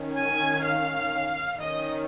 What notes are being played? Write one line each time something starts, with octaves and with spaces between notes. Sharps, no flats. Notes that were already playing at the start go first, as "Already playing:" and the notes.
Already playing: D#3 C#4
G#5
F5
D#3 C#4 D#5